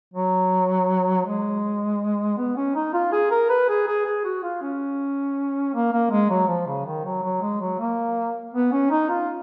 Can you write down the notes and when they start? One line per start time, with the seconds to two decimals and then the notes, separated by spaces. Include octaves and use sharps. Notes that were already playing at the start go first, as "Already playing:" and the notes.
0.14 F#3
1.26 G#3
2.37 B3
2.57 C#4
2.75 D#4
2.94 F4
3.12 G#4
3.31 A#4
3.50 B4
3.68 G#4
3.87 G#4
4.06 G#4
4.25 F#4
4.43 F4
4.62 C#4
5.74 A#3
5.92 A#3
6.11 G#3
6.30 F#3
6.48 F3
6.67 C#3
6.86 D#3
7.04 F#3
7.23 F#3
7.42 G#3
7.61 F#3
7.79 A#3
8.54 B3
8.72 C#4
8.90 D#4
9.09 F4